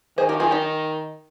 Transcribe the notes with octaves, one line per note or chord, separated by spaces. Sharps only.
D#3 G#4 C5
G4 A#4
F4 G#4
D#4 G4